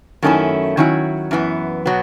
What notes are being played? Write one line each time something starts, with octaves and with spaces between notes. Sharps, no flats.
F#2 D#3 A3 C#4 E4
D#3 F#3 C#4 E4
F#2 E3 B3
B2 F#3 B3